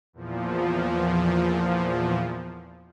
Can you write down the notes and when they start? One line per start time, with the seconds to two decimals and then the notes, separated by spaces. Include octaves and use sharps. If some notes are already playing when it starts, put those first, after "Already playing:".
0.13 E2 A#2 F3